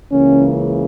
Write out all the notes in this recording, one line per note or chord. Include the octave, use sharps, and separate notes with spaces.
C#2 C#3 E3 A#3 C#4